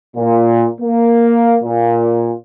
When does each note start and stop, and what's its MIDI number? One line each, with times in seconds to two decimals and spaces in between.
0.16 0.67 46
0.80 1.56 58
1.62 2.31 46